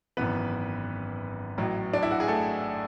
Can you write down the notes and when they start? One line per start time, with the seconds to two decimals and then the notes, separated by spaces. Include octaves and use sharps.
0.17 G#1 F#2 E3 B3 B4
1.58 A1 A2 F#3
1.93 D4
2.03 E4
2.11 F#4
2.20 G#4
2.28 A3 A4